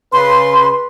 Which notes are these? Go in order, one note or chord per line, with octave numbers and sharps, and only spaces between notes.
C#3 B4 C6